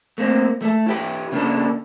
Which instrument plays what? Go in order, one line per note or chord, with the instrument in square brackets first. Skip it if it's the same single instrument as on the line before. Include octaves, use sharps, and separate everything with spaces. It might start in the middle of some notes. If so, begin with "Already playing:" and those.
[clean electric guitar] A3 A#3 C4
A3 A4
E4 G4 B4
C#3 A#3 D4 A4